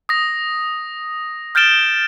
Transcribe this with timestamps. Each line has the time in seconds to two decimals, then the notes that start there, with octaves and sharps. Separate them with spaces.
0.09 D#6 A#6
1.55 F6 G6 A6 D7 E7 G7